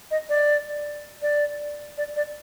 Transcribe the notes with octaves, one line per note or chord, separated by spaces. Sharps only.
D#5
D5
D5
D5
D5